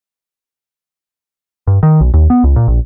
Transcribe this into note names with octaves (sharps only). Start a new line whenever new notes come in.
G2
D#3
B1
D#2
B3
C#2
A#2
A#1